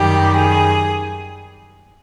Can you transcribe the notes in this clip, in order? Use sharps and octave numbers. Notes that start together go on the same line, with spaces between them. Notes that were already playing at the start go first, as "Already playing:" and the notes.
Already playing: F#2 D#3 G3 G4
G#4